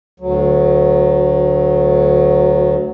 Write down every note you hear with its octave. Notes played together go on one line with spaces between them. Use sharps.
D2 F#3